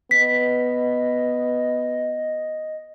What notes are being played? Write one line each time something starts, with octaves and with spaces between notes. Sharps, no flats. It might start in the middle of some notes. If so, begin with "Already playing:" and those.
B3 D#5 B6